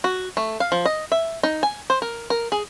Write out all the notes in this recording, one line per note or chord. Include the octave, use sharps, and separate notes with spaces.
F#4
A3
F5
F3
D#5
E5
D#4
G#5
C5
A#4
A#4
G#4